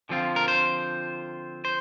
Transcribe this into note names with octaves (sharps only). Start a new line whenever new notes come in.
D3 F3 C4 F4
A#4
C5
C5